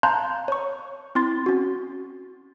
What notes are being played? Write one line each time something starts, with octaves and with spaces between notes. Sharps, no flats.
F5 A5 A#5 C6 F#6 G6
C#5 C#6
C4 E4 C6 A6
C#4 F#4